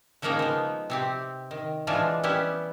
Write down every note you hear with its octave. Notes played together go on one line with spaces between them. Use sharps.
C#3 F3 G#3 A#3 D#4 G5
F3 B3
C3 C4 G4
D#3
E3 F3 G#3 D4 F4
G3 B3 C#4 E4 G4